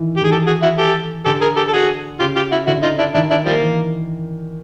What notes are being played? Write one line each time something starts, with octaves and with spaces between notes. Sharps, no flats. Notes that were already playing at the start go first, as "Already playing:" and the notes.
Already playing: D#3 E3
G4
D#3 G#4
E3 G4 A4
F#4 G#4
E4 F#4
G4 A4
D3 G4 A4
G#4 A#4
G4 A4
A4
F#4 G#4
C#3 F4 G4
F4 G4
E4 F#4
D3 E4 F#4
D#4 F4
D4 E4
D#3 D4 E4
D4 E4
F3 G3 A#3
E3